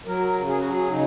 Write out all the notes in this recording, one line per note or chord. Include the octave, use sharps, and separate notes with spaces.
F#3 A#4
C#3
G#4
F#3 F#4
G#4
C#3 D#4